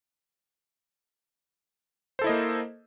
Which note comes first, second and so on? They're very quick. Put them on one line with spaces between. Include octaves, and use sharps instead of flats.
C5 A4 E4 D#5 A#3